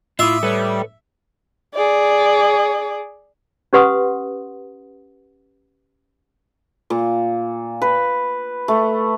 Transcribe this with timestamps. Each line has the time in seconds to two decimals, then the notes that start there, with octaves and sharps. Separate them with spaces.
0.19 A2 E4 F4 E5 D6 D#6
0.43 G3 A4 B4 C#5
1.74 G#4 D5
3.73 C#4 G4 B4 F#5 C6 D#6
6.90 A#2
7.82 B4
8.68 A3